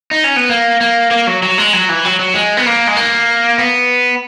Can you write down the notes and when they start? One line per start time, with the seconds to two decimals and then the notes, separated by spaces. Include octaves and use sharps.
0.11 D#4
0.24 C#4
0.36 B3
0.50 A#3
0.81 A#3
1.11 A#3
1.27 F#3
1.43 F#3
1.58 G#3
1.73 F#3
1.89 E3
2.05 F#3
2.20 F#3
2.34 G#3
2.57 B3
2.66 A#3
2.87 G#3
2.96 A#3
3.58 B3